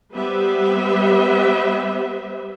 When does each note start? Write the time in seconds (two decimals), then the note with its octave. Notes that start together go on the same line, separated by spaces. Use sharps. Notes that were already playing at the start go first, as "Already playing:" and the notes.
0.14 G3 B3 G4 B4 C5 E5